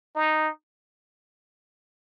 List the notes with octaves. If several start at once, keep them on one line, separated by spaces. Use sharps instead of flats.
D#4